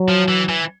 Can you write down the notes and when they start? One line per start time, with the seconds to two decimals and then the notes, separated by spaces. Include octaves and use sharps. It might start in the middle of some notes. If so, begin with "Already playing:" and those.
Already playing: F#3
0.08 F3
0.28 E3
0.49 E3